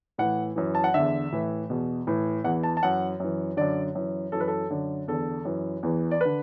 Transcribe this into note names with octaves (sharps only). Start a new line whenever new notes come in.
A2 E3 F#5
F#2 E3
A5
F#5
E2 D3 E5
A2 E3
E2 B2
A2 E3
E2 E3 F#5
A5
A5
F#2 E3 F#5
F#2 E3
F#2 D3 D5
F#2 E3
F#2 E3 A4
B4
A4
F#2 D3
E2 D3 A4
F#2 E3
E2 E3
D5
D3 B4